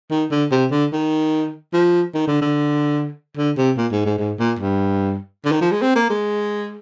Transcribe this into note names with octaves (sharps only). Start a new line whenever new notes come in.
D#3
D3
C3
D3
D#3
F3
D#3
D3
D3
D3
C3
A#2
G#2
G#2
G#2
A#2
G2
D3
D#3
F3
G#3
C4
A#3
G#3